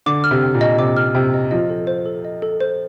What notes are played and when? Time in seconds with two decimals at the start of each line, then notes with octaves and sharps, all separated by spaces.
0.06 D3 D6
0.24 F6
0.31 C3
0.43 G5
0.55 A#2
0.61 D#5
0.78 C3 D6
0.97 F6
1.15 C3 G5
1.34 D#5
1.51 F3 D#5
1.70 A4
1.87 C5
2.06 A4
2.25 D#5
2.42 A4
2.60 C5